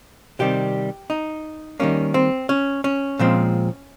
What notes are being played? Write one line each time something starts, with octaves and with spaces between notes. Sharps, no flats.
C3 D#3 G3 C4 G4
D#4
D#3 G3 A#3 C#4
C4
C#4
C#4
A#2 F3 G#3 C4